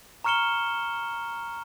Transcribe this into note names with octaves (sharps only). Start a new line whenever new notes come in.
A#5 C#6 F6 C#7 E7 G7